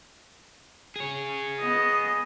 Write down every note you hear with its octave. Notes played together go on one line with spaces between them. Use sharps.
G#4 C#5
B3 D#5